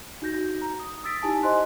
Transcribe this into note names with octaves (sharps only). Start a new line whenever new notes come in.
D#4 F#4 G6 A#6
A#5
D#6
D#6 E6 A6 B6 D7
D#4 E4 G4 G#5 A5
G4 C5 D#5 G#5 C6 F#6